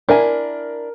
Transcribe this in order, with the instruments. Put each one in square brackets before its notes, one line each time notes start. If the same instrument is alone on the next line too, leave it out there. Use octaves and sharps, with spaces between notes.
[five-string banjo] D4 E4 G#5 [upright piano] A#4